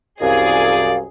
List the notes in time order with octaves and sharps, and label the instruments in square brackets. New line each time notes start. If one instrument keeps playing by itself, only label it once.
[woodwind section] C2 F#2 [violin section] G#4 [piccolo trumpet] D5 [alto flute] F5